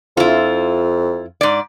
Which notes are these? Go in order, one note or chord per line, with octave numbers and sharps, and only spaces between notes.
F2 E4 F4
G#2 D5